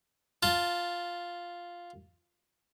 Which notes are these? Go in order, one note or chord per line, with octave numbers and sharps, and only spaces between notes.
F4 A5